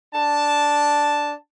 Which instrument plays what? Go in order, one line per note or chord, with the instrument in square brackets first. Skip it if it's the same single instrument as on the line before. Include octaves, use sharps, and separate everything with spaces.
[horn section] D4 A5